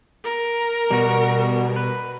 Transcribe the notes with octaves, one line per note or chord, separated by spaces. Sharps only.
A#4
B2 G3 F#4
B4